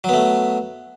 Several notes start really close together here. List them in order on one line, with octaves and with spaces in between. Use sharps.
F#3 B3 A3